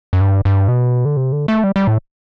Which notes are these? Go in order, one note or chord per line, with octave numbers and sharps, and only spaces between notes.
F#2
G2
G2
B2
D3
C3
D3
A3
G3
G3
A2